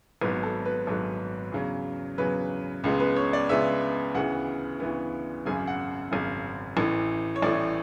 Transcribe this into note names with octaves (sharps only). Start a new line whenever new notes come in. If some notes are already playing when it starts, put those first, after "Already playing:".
G#1 G#2 F#3 B3 B4
A4
B4
G#1 G#2 F#3 B3 A4
E2 C#3 F#3
E2 C#3 F#3 B4
C#2 C#3 G#3 B3
B4
C#5
D5
C#2 C#3 G#3 B3 E5
D2 C#3 E3 B3 F#5
D2 C#3 E3 B3
G#1 F#2 C#3 G#5
F#5
G#1 F#2 C#3
A1 A2 E3
C#5
A1 A2 E3 D5